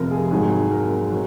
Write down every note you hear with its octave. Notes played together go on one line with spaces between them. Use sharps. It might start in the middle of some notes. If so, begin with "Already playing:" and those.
Already playing: F1 F2 C3 F3 A#4
G#4
G#1 G#2 D#3 F#3 G#4
A#4
F#3